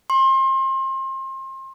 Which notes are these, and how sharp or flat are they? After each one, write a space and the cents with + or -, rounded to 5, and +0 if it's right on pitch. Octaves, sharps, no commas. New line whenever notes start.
C6 +30